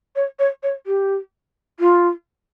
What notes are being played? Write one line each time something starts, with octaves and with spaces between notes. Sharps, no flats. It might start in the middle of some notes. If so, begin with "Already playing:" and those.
C#5
C#5
C#5
G4
F4